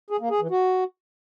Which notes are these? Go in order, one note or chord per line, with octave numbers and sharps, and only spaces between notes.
G#4
A#3
G#4
E3
F#4